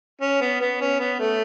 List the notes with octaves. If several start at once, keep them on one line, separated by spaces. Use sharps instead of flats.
C#4
B3
B3
C#4
B3
A3